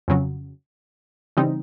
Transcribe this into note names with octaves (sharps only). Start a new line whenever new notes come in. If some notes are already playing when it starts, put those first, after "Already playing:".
F2 C#3 F#3
C#3 E3 G3 C4 D#4